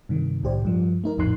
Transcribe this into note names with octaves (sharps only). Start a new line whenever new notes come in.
G2 C3 D#3
C2 A2 G4 C5 D5
G2 F3
A3 D#4 A#4
A#1 F2 A2 D#4 C6 F#6